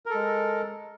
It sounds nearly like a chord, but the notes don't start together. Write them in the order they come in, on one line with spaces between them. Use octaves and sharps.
A#4 A4 G#3